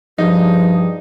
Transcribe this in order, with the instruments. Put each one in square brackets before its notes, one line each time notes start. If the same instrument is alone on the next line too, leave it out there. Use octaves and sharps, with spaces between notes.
[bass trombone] G2 [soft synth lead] F3 [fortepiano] D#4 [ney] G#4